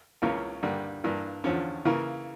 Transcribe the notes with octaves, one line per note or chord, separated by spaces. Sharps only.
C#2 C#3 E3 A#3 C#4
G2 D3 G3 A#3
G2 E3 A#3 D4
E2 D3 F3 C#4
C#3 E3 A#3